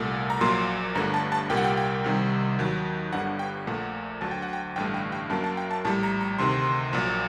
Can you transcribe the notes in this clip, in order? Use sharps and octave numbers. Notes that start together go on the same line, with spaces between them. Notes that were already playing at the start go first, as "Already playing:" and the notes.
Already playing: C2 A#2 A3
A#5
A#1 A#2 F#3 A#3 C6
G1 G2 D3 A3 A#5
A5
A5
C2 A#2 G3 A#3 G5
F#5
G5
G5
C2 C3 D#3 G3
D#2 D#3 F#3
G1 G2 D3 F#5
G5
A#1 A#2 A3 F#5
D2 D3 F#3 A5
G5
F#5
G5
A1 G2 D3 A3 G5
G5
G5
F#2 F#3 A#3 A5
A5
G5
A5
A#1 A2 G3 A5
A#5
A#5
D2 C3 D#3 C6
A#1 A#2 F#3